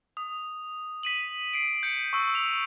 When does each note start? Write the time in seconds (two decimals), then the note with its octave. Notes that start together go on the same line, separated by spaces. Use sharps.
0.17 D#6
1.03 B6 D#7 F#7
1.53 C7 D7
1.83 G6 C#7
2.13 C#6 E6
2.33 B6 F7